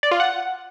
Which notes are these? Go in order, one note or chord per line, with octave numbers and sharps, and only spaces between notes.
D5
F4
F#5